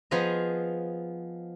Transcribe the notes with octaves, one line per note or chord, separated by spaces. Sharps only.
F3 B3 F4 G#4 D#5 A#5